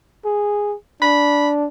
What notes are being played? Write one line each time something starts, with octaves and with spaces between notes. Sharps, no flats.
G#4
D4 B5